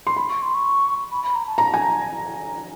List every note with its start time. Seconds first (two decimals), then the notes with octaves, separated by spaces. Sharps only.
0.07 C6
0.16 B5
0.29 C#6
0.42 C6
0.55 C#6
1.11 B5
1.23 B5
1.35 A#5
1.47 A5
1.58 A#5
1.74 G#5